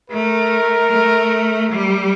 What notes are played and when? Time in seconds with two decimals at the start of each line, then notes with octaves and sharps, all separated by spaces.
0.10 A3 A#4
0.91 A3
1.72 G3